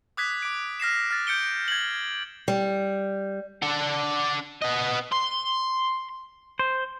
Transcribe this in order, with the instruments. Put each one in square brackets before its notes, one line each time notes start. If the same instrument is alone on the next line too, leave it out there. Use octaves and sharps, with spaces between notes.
[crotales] D6 D#6 F#6 G#6 B6
D6 D7
F6 A#6 C7 E7
F6 A6
G6 C#7 D7 G7
G#6 F#7
[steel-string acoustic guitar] G3
[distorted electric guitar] D4 F#5
B3 D#5
C6
[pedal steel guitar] C5